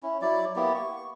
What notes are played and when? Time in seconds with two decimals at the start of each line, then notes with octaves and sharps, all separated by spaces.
0.03 C#4 E4
0.22 F#3 E4 D5
0.56 A#3 B3 E4 G4
0.75 C#6